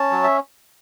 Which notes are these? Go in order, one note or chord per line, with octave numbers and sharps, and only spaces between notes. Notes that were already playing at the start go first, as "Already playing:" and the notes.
Already playing: C#4 A5
F#3
E5